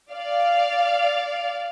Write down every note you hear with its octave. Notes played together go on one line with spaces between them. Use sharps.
D5 F5